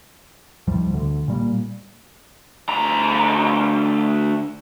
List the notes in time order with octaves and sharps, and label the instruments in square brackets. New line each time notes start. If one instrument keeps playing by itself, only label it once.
[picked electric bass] D#2 A2 F3 G3
D2 D3
A#2 G3 A#3
[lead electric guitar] D2 A#5